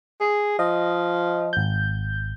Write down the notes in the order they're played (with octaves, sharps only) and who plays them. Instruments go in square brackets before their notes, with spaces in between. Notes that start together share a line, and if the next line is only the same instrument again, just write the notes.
[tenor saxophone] G#4
[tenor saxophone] F3 [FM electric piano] D#5
[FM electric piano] G#1 G6